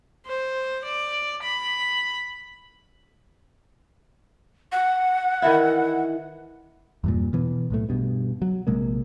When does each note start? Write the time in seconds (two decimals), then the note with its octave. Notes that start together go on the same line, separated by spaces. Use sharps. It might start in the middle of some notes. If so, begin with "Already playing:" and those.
0.26 C5
0.85 D5
1.43 B5
4.72 F#5
5.42 D#3 E3 E4
7.04 E2 G2 A#2
7.33 B2 E3 B3
7.70 B1 A2 A3
7.89 G2 B2
8.42 F#3
8.67 A#1 C3 G#3 A#3